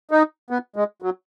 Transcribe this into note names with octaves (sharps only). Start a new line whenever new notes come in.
D#4
B3
G#3
F#3